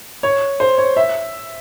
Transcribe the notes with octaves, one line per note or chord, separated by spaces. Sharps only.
C#5
C5
C#5
E5